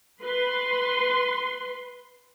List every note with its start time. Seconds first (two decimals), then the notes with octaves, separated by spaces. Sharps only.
0.22 B4 C6